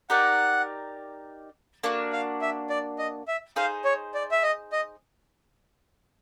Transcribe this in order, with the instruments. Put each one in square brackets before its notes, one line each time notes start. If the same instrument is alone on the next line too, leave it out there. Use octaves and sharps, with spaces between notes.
[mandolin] D#4 G4 A#4 D5 [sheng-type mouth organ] F#5
[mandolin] A#3 D4 F#4
[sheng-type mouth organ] F5
E5
D5
D#5
E5
[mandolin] D#4 G#4 C5 [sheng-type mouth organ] F5
[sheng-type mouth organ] C#5
D5
E5
D#5
D#5